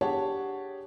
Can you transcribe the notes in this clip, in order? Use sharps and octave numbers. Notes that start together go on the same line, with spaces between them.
D4 G4 G#4 C#5 F#5 A5